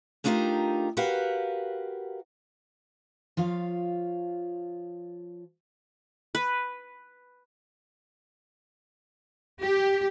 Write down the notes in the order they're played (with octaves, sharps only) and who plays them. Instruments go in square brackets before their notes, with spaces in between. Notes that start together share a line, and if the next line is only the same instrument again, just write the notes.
[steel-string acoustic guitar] A3 D4 D#4 F4 G4 A#4
F#4 G4 A#4 B4 F5 F#5
F3 F4 C#5 F5
[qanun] B4
[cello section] G4